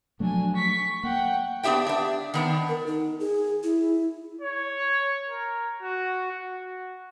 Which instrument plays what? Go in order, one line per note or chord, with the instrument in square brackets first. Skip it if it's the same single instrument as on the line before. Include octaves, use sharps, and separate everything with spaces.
[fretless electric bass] F3 F#3 A3 [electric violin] D4 G#5
[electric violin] C#6 B6
[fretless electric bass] A#3 [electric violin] F#5 G5
[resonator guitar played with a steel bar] B3 D4 G4 E5 G5
D4 E5
D#3 B3 D4
[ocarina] A#4
D#4
G#4
E4
[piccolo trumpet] C#5
A#4
F#4
F#4